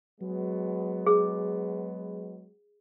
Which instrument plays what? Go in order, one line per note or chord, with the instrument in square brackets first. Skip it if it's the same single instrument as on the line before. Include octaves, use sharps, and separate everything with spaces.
[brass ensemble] F#3 G#3 B3
[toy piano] G#4